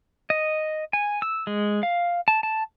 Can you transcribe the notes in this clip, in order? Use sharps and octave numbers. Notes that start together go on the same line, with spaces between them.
D#5
G#5
E6
G#3
F5
A5
A5